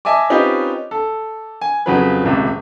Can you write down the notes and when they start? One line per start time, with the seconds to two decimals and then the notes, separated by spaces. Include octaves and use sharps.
0.05 D#5 E5 G#5 A5 D6
0.30 C4 C#4 D#4 F4 G4 B4
0.91 A4
1.61 G#5
1.86 F2 C#3 F#3 B4
2.24 D#1 C#2 C3